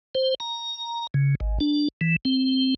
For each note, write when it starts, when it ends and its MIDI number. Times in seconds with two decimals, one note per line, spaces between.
0.15 0.34 72
0.40 1.07 82
1.14 1.35 49
1.40 1.58 32
1.60 1.88 62
2.01 2.16 52
2.25 2.74 60